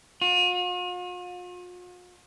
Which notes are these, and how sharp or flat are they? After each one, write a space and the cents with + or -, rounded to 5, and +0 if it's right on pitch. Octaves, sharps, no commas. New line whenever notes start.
F4 +45